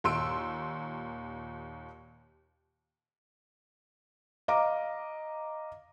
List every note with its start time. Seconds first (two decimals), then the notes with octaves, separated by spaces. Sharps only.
0.04 D#2 A#2 C6 E6 D7
4.48 D#5 F5 A#5 D6